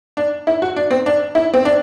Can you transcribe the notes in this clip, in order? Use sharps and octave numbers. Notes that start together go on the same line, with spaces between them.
D4
E4
F#4
D4
C4
D4
E4
C4
D4